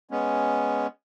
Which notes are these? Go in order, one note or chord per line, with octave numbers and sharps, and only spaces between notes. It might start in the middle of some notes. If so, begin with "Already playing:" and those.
G#3 B3 C#4